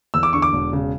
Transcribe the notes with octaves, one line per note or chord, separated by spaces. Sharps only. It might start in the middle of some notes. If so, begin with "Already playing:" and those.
E2 E6
D6
D3 C#6
D6
E1
C#3